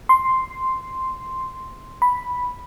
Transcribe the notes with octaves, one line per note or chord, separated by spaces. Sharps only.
C6
B5